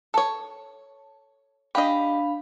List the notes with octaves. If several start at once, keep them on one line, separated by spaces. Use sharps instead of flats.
A4 C#5
D4 G4 D#5 F5 B5